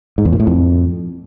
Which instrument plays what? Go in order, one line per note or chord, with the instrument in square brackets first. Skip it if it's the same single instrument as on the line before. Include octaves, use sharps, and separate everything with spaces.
[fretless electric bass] G#2
E2
A#2
A2
F2